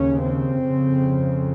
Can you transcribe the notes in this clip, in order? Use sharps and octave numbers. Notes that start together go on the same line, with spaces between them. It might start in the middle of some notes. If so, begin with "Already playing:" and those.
Already playing: D#2 C#3 C#4
C4
F2 C#3